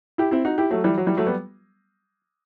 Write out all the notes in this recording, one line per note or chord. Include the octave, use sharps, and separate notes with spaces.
E4 G4
C4 E4
D#4 F#4
E4 G4
F#3 A3
E3 G3
F#3
E3 G3
F#3 A3
G3 B3